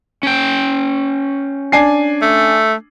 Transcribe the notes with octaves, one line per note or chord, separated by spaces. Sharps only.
C#4 G5
D4 G#5 C7
A3